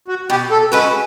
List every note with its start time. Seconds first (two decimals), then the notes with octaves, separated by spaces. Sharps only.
0.08 F#4
0.29 B2 G4
0.51 A4
0.72 G#3 C#4 F#4 B4